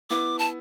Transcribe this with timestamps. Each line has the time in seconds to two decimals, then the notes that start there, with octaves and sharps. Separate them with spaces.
0.10 B3 E4 D6
0.39 A5